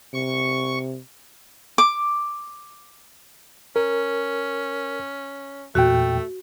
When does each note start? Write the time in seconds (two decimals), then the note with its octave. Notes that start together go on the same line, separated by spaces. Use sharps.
0.14 C3 C#6
1.78 D6
3.76 C#4 A#4
5.75 E2 A#2 A3 F#4 G5